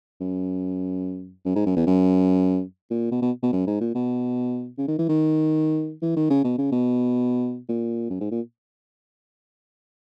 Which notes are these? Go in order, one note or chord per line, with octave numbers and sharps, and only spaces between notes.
F#2
F#2
G#2
F#2
E2
F#2
A#2
B2
B2
B2
F#2
G#2
A#2
B2
C#3
D#3
E3
D#3
E3
D#3
C#3
B2
C#3
B2
A#2
F#2
G#2
A#2